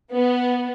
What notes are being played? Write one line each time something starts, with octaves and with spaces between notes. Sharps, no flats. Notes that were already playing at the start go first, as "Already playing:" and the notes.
B3